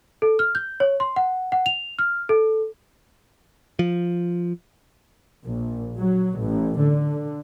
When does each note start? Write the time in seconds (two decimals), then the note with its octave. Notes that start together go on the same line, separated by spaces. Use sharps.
0.22 A4
0.39 F6
0.55 G6
0.80 C#5
1.00 C6
1.16 F#5
1.52 F#5
1.66 F7
1.99 F6
2.29 A4
3.79 F3
5.44 A#1
5.97 F#3
6.39 A1
6.78 D3